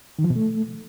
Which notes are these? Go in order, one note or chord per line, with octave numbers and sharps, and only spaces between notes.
D#3
F3
B2
A3